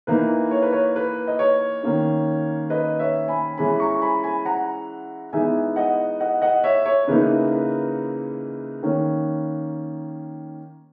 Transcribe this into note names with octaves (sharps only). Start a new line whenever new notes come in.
E3 A#3 D#4 B4
C#5
B4
C#5
B4
D#5
C#5
D#3 A#3 C#4
B4 D#5
C#5 E5
G#5 B5
E3 G#3 C#4 G#5 B5
A#5 C#6
C#6
G#5 B5
G#5 B5
F#5 A#5
E3 G#3 B3 D#4 E5 G#5
D#5 F#5
D#5 F#5
D#5 F#5
C#5 E5
C#5
C#3 E3 A#3 D#4 B4
B4
D#3 A#3 C#4